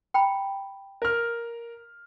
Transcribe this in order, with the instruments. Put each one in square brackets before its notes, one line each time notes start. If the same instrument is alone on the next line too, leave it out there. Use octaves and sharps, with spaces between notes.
[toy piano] G5 A#5 B5
[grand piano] A#4 F6